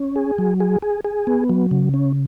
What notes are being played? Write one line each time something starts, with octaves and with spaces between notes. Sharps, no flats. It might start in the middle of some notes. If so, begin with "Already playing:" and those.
Already playing: C#4
G#4
F#3
G#4
G#4
G#4
B3
F#3
C#3
C#4